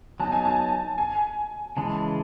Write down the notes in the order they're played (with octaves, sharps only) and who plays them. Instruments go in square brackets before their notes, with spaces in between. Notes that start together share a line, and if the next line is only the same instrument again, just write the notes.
[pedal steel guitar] F#3 B3 D#4 [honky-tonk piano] A5
[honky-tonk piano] G#5
A5
G#5
[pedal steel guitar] C#3 E3 G#3 [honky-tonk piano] A5